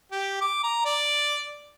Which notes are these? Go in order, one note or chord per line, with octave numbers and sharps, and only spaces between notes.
G4
D6
A#5
D5